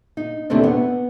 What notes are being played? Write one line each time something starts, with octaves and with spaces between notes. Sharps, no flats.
D#4
D#2 C3 E3 A3 C4 D4
B3